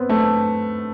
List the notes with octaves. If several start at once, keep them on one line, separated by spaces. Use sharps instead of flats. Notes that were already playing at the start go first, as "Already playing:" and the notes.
Already playing: B3 C4
A3